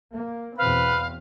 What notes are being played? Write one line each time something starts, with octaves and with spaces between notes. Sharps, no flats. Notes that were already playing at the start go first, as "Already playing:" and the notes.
A#3
E2 B2 C4 B4 F5